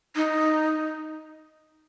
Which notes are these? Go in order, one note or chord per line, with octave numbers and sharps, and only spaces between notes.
D#4